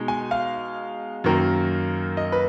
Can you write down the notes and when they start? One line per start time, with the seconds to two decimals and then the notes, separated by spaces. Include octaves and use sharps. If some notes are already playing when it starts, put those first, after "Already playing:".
Already playing: B2 G#3 D#4
0.08 G#5
0.31 F5
1.24 F#2 D#3 A#3
2.17 D#5
2.32 B4